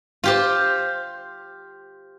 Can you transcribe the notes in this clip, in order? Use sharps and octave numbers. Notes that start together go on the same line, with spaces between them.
F4 G4 C5